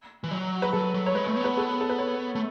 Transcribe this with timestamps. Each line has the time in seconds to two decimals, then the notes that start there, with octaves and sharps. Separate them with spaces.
0.24 E3
0.31 F#3
0.62 B4
0.73 F#3 A4
0.94 F#3
1.06 C#5
1.14 G#3 B4
1.28 A3
1.36 B3
1.44 B4
1.57 A4
1.81 A4
1.89 B4
1.98 C#5
2.35 A3